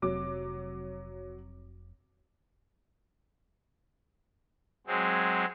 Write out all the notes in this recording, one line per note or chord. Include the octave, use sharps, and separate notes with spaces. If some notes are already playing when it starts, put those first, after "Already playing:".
F1 C3 F#3 D6
F#3 G#3 C4